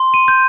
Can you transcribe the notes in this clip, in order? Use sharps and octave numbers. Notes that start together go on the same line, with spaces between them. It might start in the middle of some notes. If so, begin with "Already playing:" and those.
Already playing: C6
D#7
G6